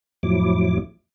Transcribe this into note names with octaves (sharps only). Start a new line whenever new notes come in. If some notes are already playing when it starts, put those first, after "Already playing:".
F2 A2 F3 F#3 E4 D6